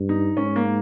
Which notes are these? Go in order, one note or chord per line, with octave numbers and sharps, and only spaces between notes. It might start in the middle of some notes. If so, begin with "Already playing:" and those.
Already playing: G2
D#4
G#2 C#4
A#3